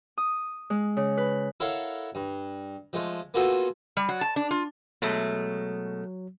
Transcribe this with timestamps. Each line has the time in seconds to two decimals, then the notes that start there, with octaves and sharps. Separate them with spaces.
0.18 D#6
0.70 G#3
0.97 C#3
1.17 B4
1.60 E4 A4 A#4 C#5 F5 F#5
2.15 G2
2.93 F3 G#3 A3
3.34 A#3 B3 F4 F#4 G#4 A4
3.97 G3
4.09 F#3
4.21 A5
4.36 D4
4.51 F4
5.02 B2 F#3 G#3 A3